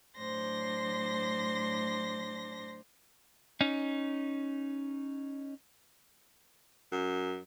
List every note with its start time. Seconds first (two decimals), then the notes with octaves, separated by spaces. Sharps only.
0.18 A2 F#3 D4 C5 C6 A#6
3.61 C#4 D#4
6.92 F#2